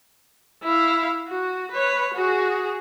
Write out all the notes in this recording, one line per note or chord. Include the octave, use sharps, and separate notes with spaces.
E4 F5
F#4
B4 C#5
F#4 G#4